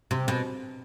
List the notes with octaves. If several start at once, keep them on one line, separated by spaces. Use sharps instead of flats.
C3
B2